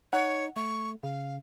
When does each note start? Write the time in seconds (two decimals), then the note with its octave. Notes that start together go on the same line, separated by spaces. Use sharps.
0.13 D#4 C#5 F#5
0.56 A3 C#6
1.03 C#3 F5